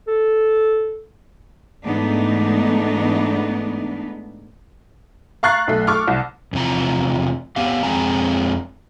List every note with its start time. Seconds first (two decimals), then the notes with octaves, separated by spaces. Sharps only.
0.08 A4
1.85 G#2 E3 A3 B3 D4 D#4
5.43 F5 A#5 C#6 F#6 A6 C7
5.68 B1 A3
5.87 A4 C#6 D6 F6
6.08 C2
6.53 E2 C3 F3 A#5
7.56 B3 G4 F5
7.83 F2 G#3 C4 G#5 A#5